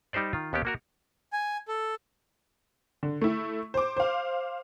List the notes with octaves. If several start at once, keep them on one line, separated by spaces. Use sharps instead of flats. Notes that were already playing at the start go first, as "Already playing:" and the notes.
G3 D#4 G4 C5 D5
D#3 F4
D#2 B3 C#4 G4
A#3 F#4 A#4
G#5
A4
D3
A3 E4
C5 D6
C5 F5